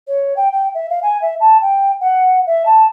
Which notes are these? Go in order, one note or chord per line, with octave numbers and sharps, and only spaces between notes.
C#5
G5
G5
E5
F5
G#5
E5
A5
G5
F#5
E5
A5